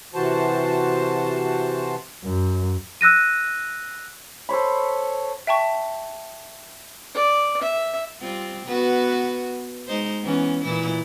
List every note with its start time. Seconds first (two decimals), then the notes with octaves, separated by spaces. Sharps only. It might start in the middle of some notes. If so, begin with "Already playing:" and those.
0.15 C3 E3 F#4 C5 A5
2.24 F#2
3.01 E6 F#6 A#6 D#7
4.49 A4 C5 C#5 B5
5.47 E5 G5 A5 C#6
7.15 D5
7.62 E5
8.21 G3 C4 F4
8.66 B3 F#4 B4
9.87 G#3 D#4 C5
10.23 E3 B3 C#4
10.64 A#2 E3 E4